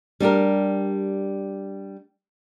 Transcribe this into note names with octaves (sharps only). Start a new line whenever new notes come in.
G3 D4 G4 A#4